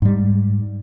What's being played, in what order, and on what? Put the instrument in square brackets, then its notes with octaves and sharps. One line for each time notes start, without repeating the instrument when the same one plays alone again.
[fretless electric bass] G#2 G3